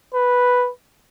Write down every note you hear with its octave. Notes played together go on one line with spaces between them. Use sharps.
B4